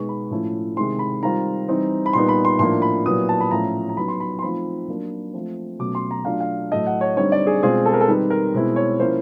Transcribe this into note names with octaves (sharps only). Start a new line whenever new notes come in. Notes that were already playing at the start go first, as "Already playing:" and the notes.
Already playing: B2 G#3 B3 D#4 C#6
B5
A2 F3 A3 C#4 E4
C3 D#3 G#3 C4 C6
B5
D#3 G3 C4 F4 A#5
E3 G3 C4 D#4
B5
A#2 G3 B3 D#4 C6
B5
C6
A2 F3 A#3 D4 C6
B5
A#2 F#3 B3 E4 D#6
A5
B5
A2 F3 A3 C#4 A#5
A#5
F#3 B3 D#4 B5
C6
B5
C6
F3 A3 C4 D#4 B5
F#3 A#3 D4
F3 A3 C4
B2 F#3 A3 C#4 D6
C6
A#5
F#3 A3 D4 F4 F5
F5
A2 F#3 A3 D#5
F#5
C#5
D3 G3 C4 D#4 C#5
D5
G#4
B2 G#3 C4 F4 G#4
A4
A#4
A4
D#3 G3 C4 D#4 B4
A#4
B2 G#3 C4 E4
C#5
F3 A#3 C#4 E4 C5